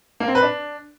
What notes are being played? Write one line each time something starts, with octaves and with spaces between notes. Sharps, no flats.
A#3
C4
B4
D4